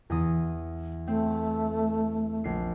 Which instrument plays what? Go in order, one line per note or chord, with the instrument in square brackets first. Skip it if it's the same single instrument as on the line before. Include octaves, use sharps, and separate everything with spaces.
[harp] E2 E3 D#6
[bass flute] A3 [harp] C4
[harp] A#1 C7